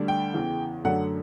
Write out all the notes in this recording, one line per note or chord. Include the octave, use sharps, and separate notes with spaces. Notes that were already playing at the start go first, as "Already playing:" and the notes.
Already playing: D2 D3 G3 D4
G5
E2 C#3 E3
F#2 D3 F#3 A3 D4 F#5